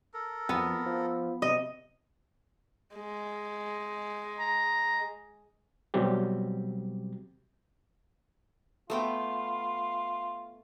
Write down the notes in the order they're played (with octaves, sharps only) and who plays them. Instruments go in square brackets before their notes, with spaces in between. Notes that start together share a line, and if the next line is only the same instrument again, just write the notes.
[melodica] A4 A#4
[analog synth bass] F2 [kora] B3
[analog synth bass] F3
[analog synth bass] C3 [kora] D#5
[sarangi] G#3
[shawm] A#5
[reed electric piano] B2 F#3 G3 C4 G4
[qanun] A3 B3 G5 [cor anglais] F4